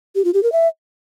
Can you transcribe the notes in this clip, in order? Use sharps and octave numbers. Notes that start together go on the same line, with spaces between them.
G4
F4
G4
A#4
E5